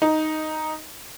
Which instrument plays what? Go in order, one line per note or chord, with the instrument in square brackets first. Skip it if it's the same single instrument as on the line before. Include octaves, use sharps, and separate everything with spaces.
[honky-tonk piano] D#4